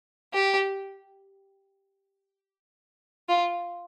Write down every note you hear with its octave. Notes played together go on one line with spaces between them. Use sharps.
G4
F4